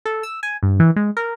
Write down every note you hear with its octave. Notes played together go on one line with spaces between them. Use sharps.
A4
E6
G#5
G2
E3
G#3
A#4